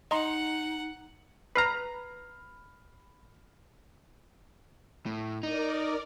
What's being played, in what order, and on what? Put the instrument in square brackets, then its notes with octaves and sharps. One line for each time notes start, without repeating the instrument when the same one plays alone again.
[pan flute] D#4 [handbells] D#5 A#5 C6 [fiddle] F#5
[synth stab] B4 A#5 [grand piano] B5 F6 C7
[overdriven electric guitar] A2
[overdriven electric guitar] D#4 [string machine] A#4 D5 D6